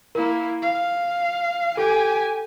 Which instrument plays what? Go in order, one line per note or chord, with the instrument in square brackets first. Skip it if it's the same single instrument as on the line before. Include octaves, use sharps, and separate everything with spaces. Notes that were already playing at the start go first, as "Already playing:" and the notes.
[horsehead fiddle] A#3 E4 [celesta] A#4
[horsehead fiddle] F5
[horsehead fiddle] G4 G#5 [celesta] A4